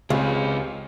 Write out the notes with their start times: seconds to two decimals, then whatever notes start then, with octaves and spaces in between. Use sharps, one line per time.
0.10 C#2 C4 F4 G4 G#4 B4